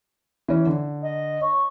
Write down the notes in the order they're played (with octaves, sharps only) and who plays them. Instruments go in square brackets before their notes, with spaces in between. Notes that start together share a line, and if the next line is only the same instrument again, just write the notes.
[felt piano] E3 C#4
D3
[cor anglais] D#5
C#5